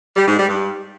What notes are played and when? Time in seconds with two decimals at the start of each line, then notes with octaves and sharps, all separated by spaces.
0.16 G3
0.27 G#2
0.38 G3
0.48 G2